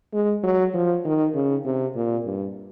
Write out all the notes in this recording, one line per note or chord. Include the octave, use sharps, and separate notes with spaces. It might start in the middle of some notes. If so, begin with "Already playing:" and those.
G#3
F#3
F3
D#3
C#3
C3
A#2
G2